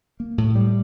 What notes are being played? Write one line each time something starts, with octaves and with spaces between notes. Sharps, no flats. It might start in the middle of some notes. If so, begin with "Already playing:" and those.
A#3
A2
G3